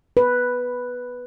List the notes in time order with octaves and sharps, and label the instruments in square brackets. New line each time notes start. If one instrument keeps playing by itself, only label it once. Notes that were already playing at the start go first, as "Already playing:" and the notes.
[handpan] B4